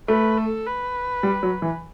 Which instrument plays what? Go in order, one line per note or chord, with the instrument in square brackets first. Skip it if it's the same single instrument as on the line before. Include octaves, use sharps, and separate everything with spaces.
[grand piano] A3 [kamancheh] B4
[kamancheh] A4
B4
[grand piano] G3
F#3
E3